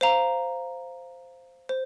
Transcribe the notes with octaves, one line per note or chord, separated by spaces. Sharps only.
C5 F5 A#5
C5